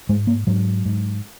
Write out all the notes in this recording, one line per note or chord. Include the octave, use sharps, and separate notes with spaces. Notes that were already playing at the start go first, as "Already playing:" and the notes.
G#2 G#3
A#3
G#2 F#3
G#2